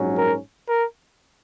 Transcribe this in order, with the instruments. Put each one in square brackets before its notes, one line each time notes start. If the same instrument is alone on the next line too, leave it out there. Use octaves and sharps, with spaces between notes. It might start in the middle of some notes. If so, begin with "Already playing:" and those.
Already playing: [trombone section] A#1 G#2 F#3 C#4
[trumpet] A#4
A#4